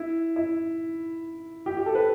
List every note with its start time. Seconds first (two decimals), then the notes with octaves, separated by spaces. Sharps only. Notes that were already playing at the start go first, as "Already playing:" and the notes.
Already playing: E4
0.36 E4
1.66 G4
1.77 G4
1.86 A4
1.95 B4